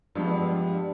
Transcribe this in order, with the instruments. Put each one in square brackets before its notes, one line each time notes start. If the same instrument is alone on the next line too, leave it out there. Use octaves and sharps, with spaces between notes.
[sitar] G2 [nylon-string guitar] F3 G#3 B3